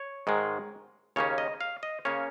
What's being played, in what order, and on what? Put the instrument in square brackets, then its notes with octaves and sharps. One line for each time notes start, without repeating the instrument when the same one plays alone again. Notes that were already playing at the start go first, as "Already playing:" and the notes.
Already playing: [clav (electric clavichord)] C#5
G#2 D#3 G#3
D#2 C#3 A#3 C#4 C#5
D#5
F5
D#5
C#3 A#3 C#4 C#5